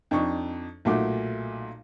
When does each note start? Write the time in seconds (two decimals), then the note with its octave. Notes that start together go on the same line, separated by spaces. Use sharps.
0.11 F2 D4 D#4 C#6
0.85 B1 A#2 A3 F#4 D6